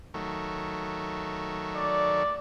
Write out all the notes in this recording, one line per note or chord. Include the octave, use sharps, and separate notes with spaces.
D#3 F#3 A3
D5